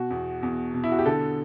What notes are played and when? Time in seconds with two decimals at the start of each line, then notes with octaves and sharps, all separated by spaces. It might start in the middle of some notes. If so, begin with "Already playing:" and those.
Already playing: B2 F#4
0.10 E2
0.43 E2
0.74 B2
0.84 E4
0.92 F#4
0.99 G4
1.06 D3 A4